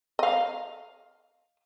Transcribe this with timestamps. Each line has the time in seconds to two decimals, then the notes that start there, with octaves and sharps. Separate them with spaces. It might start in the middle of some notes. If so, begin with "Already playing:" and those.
0.19 D#5 F5